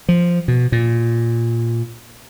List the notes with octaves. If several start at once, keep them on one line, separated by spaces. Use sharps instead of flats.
F3
B2
A#2